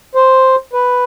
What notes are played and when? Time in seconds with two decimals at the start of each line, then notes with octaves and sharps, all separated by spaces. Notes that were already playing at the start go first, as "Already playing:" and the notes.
0.15 C5
0.73 B4